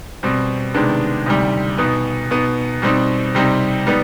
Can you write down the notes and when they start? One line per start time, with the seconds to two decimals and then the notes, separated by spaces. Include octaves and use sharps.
0.23 B2 G3 C4
0.74 C3 D#3 G#3 B3 D4
1.26 D2 C3 D#3 G3
1.78 B2 B3 D#4
2.31 B2 B3 D#4
2.82 B2 G3 C4 D#4
3.35 C3 G3 C4 D#4
3.87 G3 B3 D#4